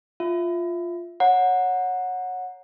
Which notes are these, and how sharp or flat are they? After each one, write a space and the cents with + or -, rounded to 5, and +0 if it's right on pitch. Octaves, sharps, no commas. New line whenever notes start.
F4 +0 E5 +0
C#5 +0 F#5 -15 A#5 +0